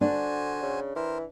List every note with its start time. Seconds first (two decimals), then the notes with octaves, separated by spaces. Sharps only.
0.01 D3 D4 F#4 C5 G#5
0.62 C#3
0.96 E3 A#4 C5